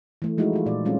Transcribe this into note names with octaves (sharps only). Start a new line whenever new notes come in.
E3 A3
F3 G#3 A3 D#4 E4 F#4
E3 F4
A#2 D5
G3 G#3 C4 C#4 F4